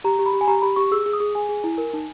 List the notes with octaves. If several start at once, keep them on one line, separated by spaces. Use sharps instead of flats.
G4 A#5
G4
B5
G4
G#5
G4 A#5
G4 B5
G4 C#6
G#4 E6
G#4
D#6
G#4
G#4 G#5
G#4
E4
A#4
D#4